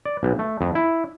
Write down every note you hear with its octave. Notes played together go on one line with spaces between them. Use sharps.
D5
B1
A3
F2
E4